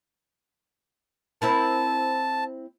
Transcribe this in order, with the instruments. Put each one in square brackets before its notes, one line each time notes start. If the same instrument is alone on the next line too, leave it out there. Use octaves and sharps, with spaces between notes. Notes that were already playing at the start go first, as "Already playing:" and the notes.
[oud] C4 E4 A#4 [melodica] A5